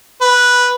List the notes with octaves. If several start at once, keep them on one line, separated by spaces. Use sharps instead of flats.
B4